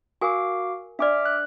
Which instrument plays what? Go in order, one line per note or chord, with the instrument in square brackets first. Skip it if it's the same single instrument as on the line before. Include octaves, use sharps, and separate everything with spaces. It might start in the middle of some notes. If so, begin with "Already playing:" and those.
[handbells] F#4 F5 D6 [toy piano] A#4 G#5
[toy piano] D4 D5 [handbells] E5 D6 F6
[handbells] F#6